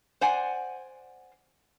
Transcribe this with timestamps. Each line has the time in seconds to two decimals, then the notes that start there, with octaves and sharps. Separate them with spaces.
0.21 C5 D5 F#5 G#5